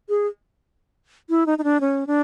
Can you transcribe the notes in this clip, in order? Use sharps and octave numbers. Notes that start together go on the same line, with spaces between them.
G#4
E4
D#4
D#4
D4
C#4
D4